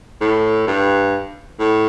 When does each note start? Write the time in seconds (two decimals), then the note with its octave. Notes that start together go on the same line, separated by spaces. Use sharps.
0.21 A2
0.67 G2
1.60 A2